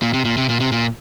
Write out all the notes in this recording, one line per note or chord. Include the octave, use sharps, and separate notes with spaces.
A#2
C3
A#2
C3
A#2
C3
A#2